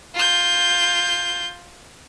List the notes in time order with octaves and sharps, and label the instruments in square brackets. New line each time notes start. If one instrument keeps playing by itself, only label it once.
[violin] F4 G6